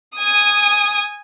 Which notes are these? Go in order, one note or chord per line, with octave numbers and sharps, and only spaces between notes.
G#5 D#6